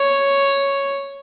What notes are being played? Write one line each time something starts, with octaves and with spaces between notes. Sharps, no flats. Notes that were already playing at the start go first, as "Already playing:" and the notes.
Already playing: C#5